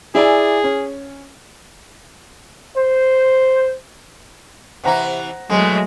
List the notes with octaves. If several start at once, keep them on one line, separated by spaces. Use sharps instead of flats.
E4 G#4 D5 G#5
C#4
C5
C3 E3 E4 C5 F#5 A#5
E2 B2 F#3 G#3 A3 C4